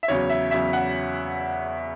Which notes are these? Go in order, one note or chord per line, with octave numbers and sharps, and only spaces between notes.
E5
E2 C#3 F#3 C#5
E5
E2 C#3 F#3 E5
F#5